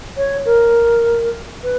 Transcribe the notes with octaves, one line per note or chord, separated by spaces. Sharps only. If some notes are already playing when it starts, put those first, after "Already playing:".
C#5
A#4
B4